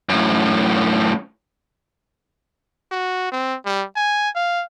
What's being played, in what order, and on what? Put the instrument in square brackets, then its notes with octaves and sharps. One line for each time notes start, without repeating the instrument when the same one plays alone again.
[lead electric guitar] F#2 A2
[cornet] F#4
C4
G3
G#5
F5